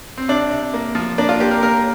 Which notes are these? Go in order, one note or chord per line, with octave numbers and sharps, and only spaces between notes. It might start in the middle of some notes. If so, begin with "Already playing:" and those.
C4
C3 D4
C3
A#3
F3
A#3 D4
F4
A#3 G4
A#4
A#3 A#4